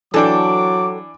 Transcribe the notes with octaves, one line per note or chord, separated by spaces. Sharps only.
E3 F#3 D4 A4 G5 D6